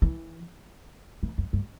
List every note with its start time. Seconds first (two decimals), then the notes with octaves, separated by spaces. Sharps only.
0.02 E3
1.23 E3
1.38 F#2
1.53 G2